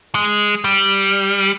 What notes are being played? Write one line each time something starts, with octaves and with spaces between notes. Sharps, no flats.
G#3
G3